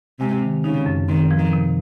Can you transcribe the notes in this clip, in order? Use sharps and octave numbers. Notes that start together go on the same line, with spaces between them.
C3 G#3
D#3
C#3 D#4
F#2
D#3 C4
F3
D#3
C3